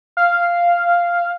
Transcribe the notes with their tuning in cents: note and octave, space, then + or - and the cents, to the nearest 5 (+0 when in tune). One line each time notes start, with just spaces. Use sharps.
F5 -5